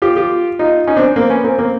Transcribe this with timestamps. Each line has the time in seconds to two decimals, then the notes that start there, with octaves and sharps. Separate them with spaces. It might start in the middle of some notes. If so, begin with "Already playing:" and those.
0.02 F4 G4
0.16 F4 G4
0.59 D#4 F4
0.87 C#4 D#4
0.96 C4 D4
1.16 A#3 C4
1.30 B3 C#4
1.44 A#3 C4
1.58 A#3 C4